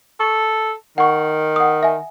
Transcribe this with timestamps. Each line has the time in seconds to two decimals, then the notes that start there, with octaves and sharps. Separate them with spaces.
0.20 A4 C#6
0.98 D#3 F#5 C#6
1.56 F#5 D#6
1.83 E5 G#5